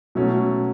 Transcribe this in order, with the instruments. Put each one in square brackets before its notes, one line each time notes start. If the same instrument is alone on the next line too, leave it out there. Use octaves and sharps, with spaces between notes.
[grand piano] B2 F#3 A3 C#4